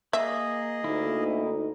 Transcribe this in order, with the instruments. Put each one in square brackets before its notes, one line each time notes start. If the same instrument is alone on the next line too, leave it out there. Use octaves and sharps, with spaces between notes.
[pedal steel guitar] A#3 [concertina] G#4 D#5 [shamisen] E5
[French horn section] D2 D#4 [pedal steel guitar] A#3 E4